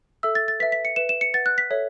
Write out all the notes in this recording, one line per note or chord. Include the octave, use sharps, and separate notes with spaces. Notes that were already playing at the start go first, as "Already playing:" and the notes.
A4 E5 E6
A6
A6
B4 E5 B6
B6
C#7
B4 E5 E7
E7
C#7
B4 F#5 A6
F#6
B6
A4 C#5 E5